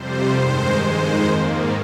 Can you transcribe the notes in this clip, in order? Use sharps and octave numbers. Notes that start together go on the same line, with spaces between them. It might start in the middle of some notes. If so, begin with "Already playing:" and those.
Already playing: F2 C3 G3 C5
G2 D#3 G#3 C5
F2 D#3 G#3 C5
G#2 D#3 A#3